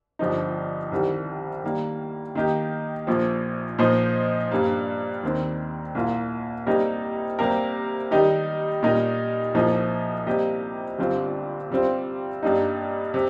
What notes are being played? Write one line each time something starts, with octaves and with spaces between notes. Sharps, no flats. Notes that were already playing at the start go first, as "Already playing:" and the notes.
G1 G2 F3 D#4
C2 C3 D#3 G3
D#3 G3 A#3
D#3 A#3 D#4 G4
A#1 A#2 F3
A#2 F3 D#4 C5 D#5
G2 G3 A#3
D#2 D#3 C4
C2 A#2 A#3 F4
C3 G3 A#3 D#4 A#4
C3 G3 A#3 G4 A#4
D#3 G3 D#4 G4
A#2 G3 D#4 A#4
C2 A#2 F3 D#4
C3 G3 A#3 G4 D#5
G1 G2 G3 C4 F4
C3 G3 C4 F4
G2 G3 A#3 D#4
C3